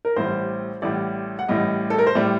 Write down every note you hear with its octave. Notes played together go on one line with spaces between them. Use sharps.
A#4
A1 A2 G3 C5
A1 A2 G3 D5
F#5
A1 A2 G3 D#5
A4
A#4
C5
A2 G3 D5